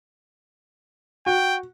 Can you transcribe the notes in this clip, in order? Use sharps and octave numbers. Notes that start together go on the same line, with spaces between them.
F#4 G5